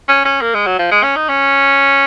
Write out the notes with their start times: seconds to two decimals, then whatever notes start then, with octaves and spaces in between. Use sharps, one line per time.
0.09 C#4
0.25 C#4
0.42 A#3
0.54 G#3
0.67 F#3
0.79 F3
0.91 G#3
1.03 C#4
1.16 D#4
1.29 C#4